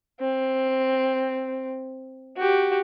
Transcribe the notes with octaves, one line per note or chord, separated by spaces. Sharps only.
C4
F#4 G4